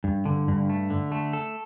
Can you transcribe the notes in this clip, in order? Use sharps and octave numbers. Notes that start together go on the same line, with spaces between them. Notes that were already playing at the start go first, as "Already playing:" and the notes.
G2
D3
G2
A3
D3
A3
A4